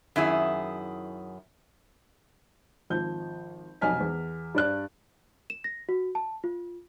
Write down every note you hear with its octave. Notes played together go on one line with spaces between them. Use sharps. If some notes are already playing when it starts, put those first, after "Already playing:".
F#2 D#3 E4 G#4
G#1 F3 G6
F1 B1 G#5 F6 B6
E2
G2 D5 F#6
E7
A#6
F#4
A5
F4